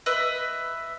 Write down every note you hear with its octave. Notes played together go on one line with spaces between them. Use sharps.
B4 D#5 E5